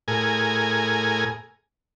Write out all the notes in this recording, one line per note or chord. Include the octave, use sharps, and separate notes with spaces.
A2 G#4 A#4 G#5